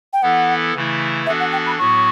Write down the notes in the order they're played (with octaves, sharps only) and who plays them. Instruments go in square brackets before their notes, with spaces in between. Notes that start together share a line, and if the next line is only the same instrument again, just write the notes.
[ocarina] G5
[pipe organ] E3 B3 E4 A4 [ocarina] F#5
[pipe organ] C#3 E3 A3 E4
[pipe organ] E3 B3 D4 F#4 A4 [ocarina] E5
[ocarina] F#5
G5
B5
[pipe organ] A2 F#3 B3 F#4 [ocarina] C#6